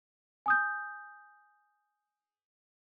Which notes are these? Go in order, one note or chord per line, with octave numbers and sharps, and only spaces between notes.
G#5 D#6 G6